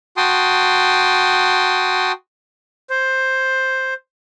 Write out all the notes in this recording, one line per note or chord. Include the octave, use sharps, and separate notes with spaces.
F#4 G5 A5 C6 D#6
C5